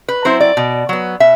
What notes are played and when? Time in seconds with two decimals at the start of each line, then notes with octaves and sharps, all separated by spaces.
0.08 B4
0.25 F#3 C4 E4 C5
0.40 D5
0.57 B2
0.89 F#3 B3
1.20 B2 E5